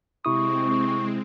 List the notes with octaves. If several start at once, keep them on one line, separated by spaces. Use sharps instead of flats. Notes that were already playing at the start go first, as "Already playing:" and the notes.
C3 G#3 C4 E4 C#6 D#6